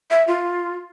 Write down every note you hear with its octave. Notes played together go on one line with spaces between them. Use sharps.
E5
F4